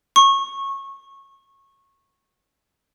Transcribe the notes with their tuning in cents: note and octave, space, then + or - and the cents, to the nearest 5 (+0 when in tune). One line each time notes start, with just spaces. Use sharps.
C#6 -20